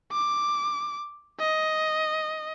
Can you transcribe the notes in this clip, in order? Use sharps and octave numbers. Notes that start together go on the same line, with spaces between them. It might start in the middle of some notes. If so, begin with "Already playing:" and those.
D6
D#5